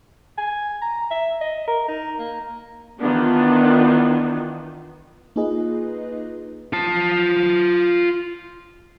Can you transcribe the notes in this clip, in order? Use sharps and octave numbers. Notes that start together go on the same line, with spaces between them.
G#5
A#5
E5
D#5
A#4
D#4
A#3
D#3 E3 B3 D4 F4
A#3 D#4 F4 G#4 B4 D#5
F4 A5